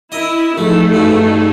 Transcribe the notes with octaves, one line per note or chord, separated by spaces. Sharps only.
E4 A#4 D#5
A1 F3 A3 D#4 G#4 A4
A1 G2 B2